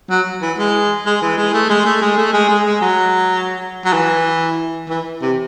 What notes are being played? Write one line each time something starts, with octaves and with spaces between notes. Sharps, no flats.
F#3
E3
G#3
G#3
E3
G#3
A3
G#3
A3
G#3
A3
G#3
G#3
G#3
F#3
F#3
E3
E3
C3